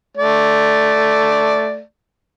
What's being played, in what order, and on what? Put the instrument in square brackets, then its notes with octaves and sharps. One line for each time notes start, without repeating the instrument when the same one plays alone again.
[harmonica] A3 D5